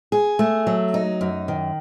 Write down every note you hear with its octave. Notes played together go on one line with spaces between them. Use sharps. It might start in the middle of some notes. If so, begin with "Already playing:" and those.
G#4
A3
F#3
D#4
F#2
D#3